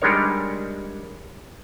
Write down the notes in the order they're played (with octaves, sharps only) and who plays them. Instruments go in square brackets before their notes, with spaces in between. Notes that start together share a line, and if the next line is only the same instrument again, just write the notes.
[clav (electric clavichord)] G3 G#3 D4 D#4 A#4 C#5